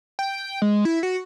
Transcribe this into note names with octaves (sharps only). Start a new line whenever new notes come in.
G5
G#3
E4
F#4